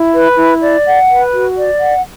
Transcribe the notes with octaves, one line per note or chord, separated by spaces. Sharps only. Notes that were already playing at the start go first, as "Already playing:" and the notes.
Already playing: E4
B4
E4
D5
F#5
B4
F#4
D5
F#5